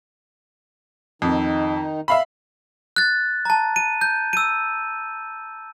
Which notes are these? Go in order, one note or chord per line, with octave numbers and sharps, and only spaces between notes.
F2 D#3 D#4
E5 F5 B5
F#6 A6
A5 A#5
D#7
G6
E6 D#7